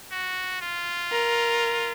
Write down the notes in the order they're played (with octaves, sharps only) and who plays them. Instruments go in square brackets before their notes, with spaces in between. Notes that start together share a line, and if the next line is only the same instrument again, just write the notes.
[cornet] F#4
F4
[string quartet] A#4